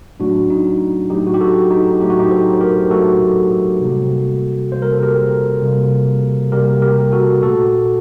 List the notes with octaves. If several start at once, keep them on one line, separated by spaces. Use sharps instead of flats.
A2 F#3 A3 D4 F#4
D#4
A2 F#3 A3 D#4 G4
F#4
G4
F#4 A4
D#4 G4
A2 F#3 A3 G4
F#4
D#4 G4
A4 C5
G4 A#4
A2 F#3 A3 F#4 A4
C3 G3 A#3
C3 G3 A#3 C5
A#4
A4
G4 A#4
C3 G3 A#3
C3 G3 A#3 G4 A#4
G4 A#4
F#4 A4
A#2 A3 F#4 A4